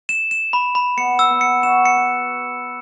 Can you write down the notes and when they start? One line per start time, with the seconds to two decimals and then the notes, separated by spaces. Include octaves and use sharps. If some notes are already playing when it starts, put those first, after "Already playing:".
0.09 E7
0.31 E7
0.53 B5
0.75 B5
0.97 B3 C#7
1.19 E6
1.30 B3
1.41 C#7
1.63 F#4 E7
1.86 C#7
1.96 B4